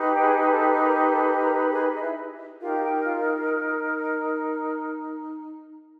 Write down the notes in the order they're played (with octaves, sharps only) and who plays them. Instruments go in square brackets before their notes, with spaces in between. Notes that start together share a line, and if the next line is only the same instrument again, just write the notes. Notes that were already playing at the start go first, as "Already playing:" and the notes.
Already playing: [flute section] D#4 G4 B4
G5
G#4 G#5
A4 A5
A#4 A#5
A4 A5
A#4 A#5
G#4 G#5
D#5
E4 E5
D#4 F4 G4 A#4 F5
G4 G5
F4 F5